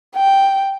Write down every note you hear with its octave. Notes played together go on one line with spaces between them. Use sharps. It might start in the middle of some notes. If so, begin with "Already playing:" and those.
G5